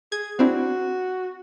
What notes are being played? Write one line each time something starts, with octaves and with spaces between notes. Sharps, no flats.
G#4 G#6
C4 D4 E4 F#4